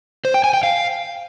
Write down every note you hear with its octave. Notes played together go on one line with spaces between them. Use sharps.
C5
G5
G#5
G5
F5